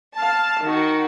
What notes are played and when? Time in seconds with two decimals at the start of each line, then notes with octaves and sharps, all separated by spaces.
0.17 F5 A5
0.62 D#3 F#4